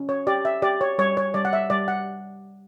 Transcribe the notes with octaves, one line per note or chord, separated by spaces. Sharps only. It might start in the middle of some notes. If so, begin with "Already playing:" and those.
Already playing: C#4
C#5
G4 D5
E5
G4 D5
C#5
G3 C#5
C#5
G3 D5
F#5
E5
G3 D5
F#5